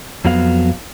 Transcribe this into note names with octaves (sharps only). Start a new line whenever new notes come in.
F2 F#3 B3 F5